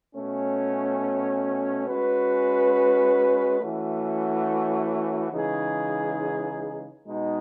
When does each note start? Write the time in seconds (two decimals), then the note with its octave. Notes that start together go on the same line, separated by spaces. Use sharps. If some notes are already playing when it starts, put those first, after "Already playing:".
0.14 B2 A3 C#4
1.87 G#3 C#4 F#4 B4
3.60 E3 A3 C#4 F#4
5.32 C#3 E3 G#3 D#4 G#4
7.05 B2 G#3 D#4